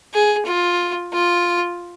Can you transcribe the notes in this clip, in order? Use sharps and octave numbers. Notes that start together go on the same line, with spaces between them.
G#4
F4
F4